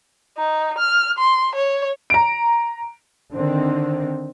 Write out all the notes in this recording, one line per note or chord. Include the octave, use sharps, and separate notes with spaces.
D#4
F6
C6
C#5
A#5 D7
D3 D#3 C4